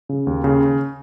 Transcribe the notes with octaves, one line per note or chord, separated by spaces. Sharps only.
C#3
D#2
C#3